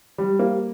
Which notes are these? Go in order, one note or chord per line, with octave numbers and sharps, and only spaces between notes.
G3
A#3